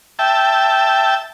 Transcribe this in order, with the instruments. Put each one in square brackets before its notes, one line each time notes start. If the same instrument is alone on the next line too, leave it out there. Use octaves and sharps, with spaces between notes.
[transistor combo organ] E5 G5 A5